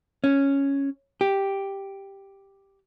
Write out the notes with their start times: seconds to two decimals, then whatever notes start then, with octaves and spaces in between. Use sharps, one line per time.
0.24 C#4
1.21 G4